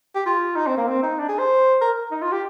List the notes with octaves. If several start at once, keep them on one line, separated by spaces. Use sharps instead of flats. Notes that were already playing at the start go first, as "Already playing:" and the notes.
G4
F4
D#4
C4
A#3
C4
D#4
D4
G#4
C5
A#4
D#4
F4
G4